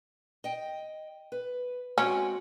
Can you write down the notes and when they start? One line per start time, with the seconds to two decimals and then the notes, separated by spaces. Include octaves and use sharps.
0.44 D#5 G5
1.32 B4
1.98 G#3 C4 C#4 F#4